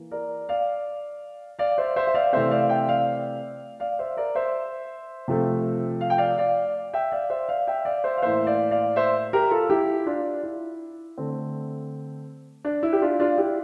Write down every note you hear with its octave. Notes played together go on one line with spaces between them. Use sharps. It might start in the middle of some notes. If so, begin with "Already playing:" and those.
Already playing: E3 A#3
A#4 D5
D5 F5
D5 F5
C5 E5
C5 E5
E5
D5 F5
C3 E3 A3 C4 C5 E5
D5 F5
E5 G5
D5 F5
D5 F5
C5 E5
A#4 D5
C5 E5
C3 F3 A3
F5
G5
D5 F5
D5 F5
E5 G5
D5 F5
C5 E5
D5 F5
E5 G5
D5 F5
C5 E5
F5
A2 E3 A#3 C5 E5
D5 F5
D5 F5
C5 E5
G4 A#4
F4 A4
E4 G4
D4 F4
E4
D3 A3 C4
D4
E4
G4
D4 F4
D4 F4
E4 G4